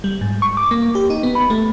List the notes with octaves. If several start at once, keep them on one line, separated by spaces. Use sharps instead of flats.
G3
G#2
C#6
D6
A#3
G4
D#4
B3
B5
A3